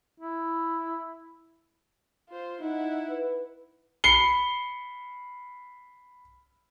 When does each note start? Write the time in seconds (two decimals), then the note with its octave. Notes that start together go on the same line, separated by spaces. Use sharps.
0.20 E4
2.29 F4 C5
2.61 D#4 E4 F#5
3.10 B4
4.04 B5 C7 C#7 G7